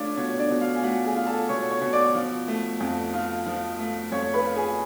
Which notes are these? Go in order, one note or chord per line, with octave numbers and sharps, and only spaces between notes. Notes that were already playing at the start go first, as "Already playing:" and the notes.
Already playing: A3 D4 F4 C#5 D5
B2 C#5
C#5
D4 D5
B2
F4 F5
G#5
A3 F#4 F#5
G#4 G#5
F4
A4 A5
B2 C#5 C#6
C#5 C#6
B2
D5 D6
F3
A3
F2
F4
F3
A3
F2 C#5 C#6
B4 B5
F4
G#4 G#5